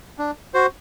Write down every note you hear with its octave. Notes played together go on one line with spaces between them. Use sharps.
D4
F#4 C5